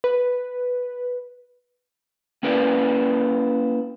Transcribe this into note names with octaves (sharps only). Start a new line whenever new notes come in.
B4
A#3 C#4 E4 A#4 B4 D5